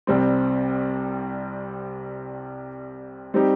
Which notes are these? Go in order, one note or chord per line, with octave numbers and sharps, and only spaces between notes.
C2 C3 G3 C4
G3 C4 D#4 G4